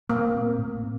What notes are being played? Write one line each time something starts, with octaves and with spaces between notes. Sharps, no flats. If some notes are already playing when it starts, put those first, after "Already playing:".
A#2 A#3
A3 C4
A2
C4